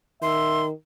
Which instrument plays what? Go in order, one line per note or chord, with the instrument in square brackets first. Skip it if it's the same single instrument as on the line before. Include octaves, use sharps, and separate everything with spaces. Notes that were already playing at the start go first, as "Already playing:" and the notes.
[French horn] D#3 [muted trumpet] E5 [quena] C6